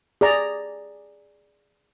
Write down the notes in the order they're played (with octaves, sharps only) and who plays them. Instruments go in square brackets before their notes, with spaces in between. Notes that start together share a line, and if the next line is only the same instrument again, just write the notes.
[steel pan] G#4 D5 A#5